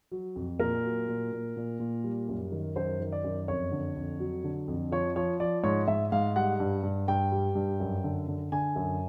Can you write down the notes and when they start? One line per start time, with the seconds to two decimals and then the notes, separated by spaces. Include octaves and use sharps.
0.11 F#3
0.36 F2
0.59 A#2 A#4
0.84 F#3
1.08 A#2
1.32 A#2
1.56 A#2
1.80 A#2
2.04 G3
2.29 F#2
2.52 D#3
2.75 F#2 C5
3.00 D#3
3.12 D5
3.24 F#2
3.48 F2 C#5
3.72 D3
3.96 F2
4.20 F#3
4.44 D3
4.68 F2
4.91 F3 C#5
5.16 F3 C#5
5.40 F3 D5
5.64 G#2 C#5
5.88 G#2 E5
6.12 G#2 F5
6.36 G3 F#5
6.60 G2
6.83 G2
7.08 G2 G5
7.32 G3
7.55 G2
7.80 F#2
8.04 D3
8.28 D3
8.52 D3 G#5
8.76 F#2